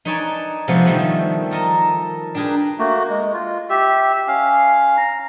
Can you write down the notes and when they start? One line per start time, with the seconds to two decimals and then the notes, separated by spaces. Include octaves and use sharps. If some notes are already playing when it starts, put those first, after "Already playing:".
0.05 D#4 B4 C#5 D5 G#5 A5
0.68 C3 F3 G#3 B3 A4 C#5
0.86 D#3 F3 G3 A3 B5
1.51 A4 A#4 D#5 A5
2.35 D4 G4 G#4 A#4 B4
2.79 A3 A#3 F#4
3.09 G#3
3.34 F4
3.69 G4 E5
4.28 C#4 F5
4.97 A#5